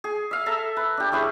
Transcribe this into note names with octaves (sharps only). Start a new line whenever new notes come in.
G#4
E5 F5
A4 E5 A#5
B4
D4 G4
C#4 E4 G#4 B4